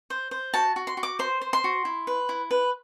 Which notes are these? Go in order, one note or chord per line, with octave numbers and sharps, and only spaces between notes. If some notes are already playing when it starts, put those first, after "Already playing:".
C5
C5
F#4 A5
F#4
C6
F#4
D6
C5 C6
C5
C6
F#4
E4
B4
E4
B4